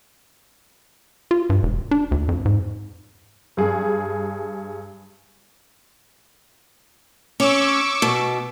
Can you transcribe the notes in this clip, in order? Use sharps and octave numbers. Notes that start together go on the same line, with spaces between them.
F4
G2
E1
D4
D2
F2
G#2
G2 G#4
C#4 C#6 D6 E6
B2